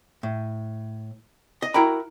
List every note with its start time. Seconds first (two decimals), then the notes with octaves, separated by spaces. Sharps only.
0.23 A2
1.62 D#5
1.74 E4 F#4 A#4 G5 A#5 B5